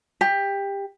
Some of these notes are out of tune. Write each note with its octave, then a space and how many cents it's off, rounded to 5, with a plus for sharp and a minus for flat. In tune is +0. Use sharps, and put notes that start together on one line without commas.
G4 +20